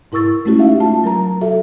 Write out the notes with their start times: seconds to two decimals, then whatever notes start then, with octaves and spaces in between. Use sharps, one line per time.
0.12 G#2 E4 A#4 C#6 E6 A6
0.45 G#3 A3 C#4 E4 F#4 G4
0.59 D#4 E5 F5
0.80 A3 F4 A5
1.04 F#3 A#4 A#5
1.41 F#4 A4 E5